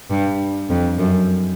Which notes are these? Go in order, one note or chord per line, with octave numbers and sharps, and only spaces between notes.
G2
F2
F#2